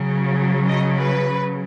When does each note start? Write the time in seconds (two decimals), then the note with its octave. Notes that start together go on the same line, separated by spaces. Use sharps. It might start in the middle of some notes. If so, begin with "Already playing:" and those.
Already playing: C#3 F#3
0.69 D#5
0.98 B4